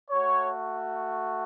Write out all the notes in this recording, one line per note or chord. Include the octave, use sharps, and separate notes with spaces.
A3 F#4 C#5